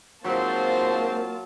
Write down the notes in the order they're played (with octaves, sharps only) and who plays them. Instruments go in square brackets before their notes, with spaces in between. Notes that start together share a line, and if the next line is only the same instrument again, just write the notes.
[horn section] G#2 C4 C5 [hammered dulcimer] F#3 [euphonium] A#3 [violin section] F4 A5